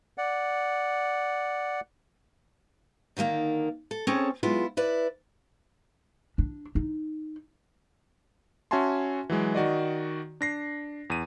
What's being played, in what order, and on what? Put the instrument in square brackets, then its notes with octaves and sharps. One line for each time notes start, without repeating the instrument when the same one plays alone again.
[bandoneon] D5 F#5
[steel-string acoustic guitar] D3 D#3 A3 A#3 D#4
A4
C4 C#4 G#4 A4 C#5
F#3 G#3 B3 E4 F4
E4 B4 D5
[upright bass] D4
D#4
[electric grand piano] C#4 F#4 E5 G#5 A5 C6
E3 F#3 G#3
D#3 F#4 D5 D#5
D4 A#6 C7
E2 D#7